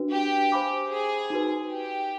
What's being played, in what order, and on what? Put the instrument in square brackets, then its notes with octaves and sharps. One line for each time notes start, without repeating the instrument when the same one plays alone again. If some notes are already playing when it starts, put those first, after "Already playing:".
Already playing: [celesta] D4 F#4 B4
[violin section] G4
[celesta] C5 F5 G#5 B5 D6
[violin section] G#4
[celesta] D#4 F#4 B4
[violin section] G4